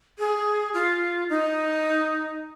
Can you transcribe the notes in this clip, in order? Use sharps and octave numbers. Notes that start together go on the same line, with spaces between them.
G#4
F4
D#4